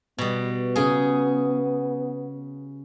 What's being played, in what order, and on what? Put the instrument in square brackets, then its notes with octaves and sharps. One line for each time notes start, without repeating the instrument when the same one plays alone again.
[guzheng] B2 G3 [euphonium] B3
[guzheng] C#3 G#4